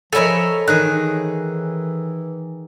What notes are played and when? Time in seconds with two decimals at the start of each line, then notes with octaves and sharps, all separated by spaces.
0.13 F3 A4 A#4 C#5 D#5 E5 G#5 B5
0.68 D#3 E3 D#4 G#4 F#6